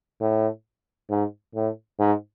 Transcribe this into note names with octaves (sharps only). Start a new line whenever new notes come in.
A2
G#2
A2
G#2